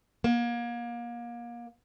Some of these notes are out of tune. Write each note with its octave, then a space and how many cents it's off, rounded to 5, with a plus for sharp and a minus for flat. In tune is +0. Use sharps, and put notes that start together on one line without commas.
A#3 +30